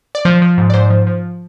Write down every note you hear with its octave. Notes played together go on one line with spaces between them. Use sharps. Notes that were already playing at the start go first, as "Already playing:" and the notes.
D5
F3 C5
F3
G#2
D5
G#2 C5
F3
F3